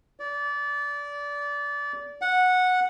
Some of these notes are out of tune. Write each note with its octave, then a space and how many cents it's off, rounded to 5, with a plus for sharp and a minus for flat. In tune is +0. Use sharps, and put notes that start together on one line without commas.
D5 -25
F#5 -10